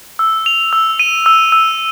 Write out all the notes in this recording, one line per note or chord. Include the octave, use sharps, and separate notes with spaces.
E6
F7
E6
D#7
E6
E6